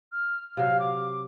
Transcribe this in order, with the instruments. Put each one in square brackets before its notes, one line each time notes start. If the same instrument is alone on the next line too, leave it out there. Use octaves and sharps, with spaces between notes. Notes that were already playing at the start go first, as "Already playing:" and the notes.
[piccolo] F6
[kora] C3 F#3 [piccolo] F5
[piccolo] D6